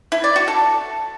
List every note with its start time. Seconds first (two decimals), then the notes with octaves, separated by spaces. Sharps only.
0.12 E4
0.24 D5
0.36 F#4
0.48 A4